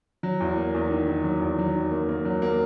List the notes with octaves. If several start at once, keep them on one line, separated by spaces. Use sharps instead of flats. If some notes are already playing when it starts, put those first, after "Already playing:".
F#3
E2
A#3
E2
D#3
D#3
F#3
E2
F#3
D#3
A#3
A#3
F#3
A#3